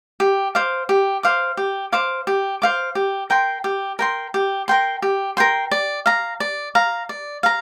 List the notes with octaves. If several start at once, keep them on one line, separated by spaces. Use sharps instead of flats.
G4
C5 F5 D6
G4
C5 F5 D6
G4
C5 F5 D6
G4
C5 F5 D6
G4
A#4 G5 C6
G4
A#4 G5 C6
G4
A#4 G5 C6
G4
A#4 G5 C6
D5
F5 A#5
D5
F5 A#5
D5
F5 A#5